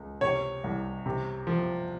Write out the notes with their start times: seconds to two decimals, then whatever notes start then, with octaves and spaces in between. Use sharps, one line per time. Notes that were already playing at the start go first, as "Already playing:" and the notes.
Already playing: C#2
0.21 C3 C#5
0.64 C2
1.06 C3
1.47 F3